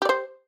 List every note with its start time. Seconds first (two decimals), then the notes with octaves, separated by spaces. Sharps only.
0.02 G4
0.05 D5
0.09 C5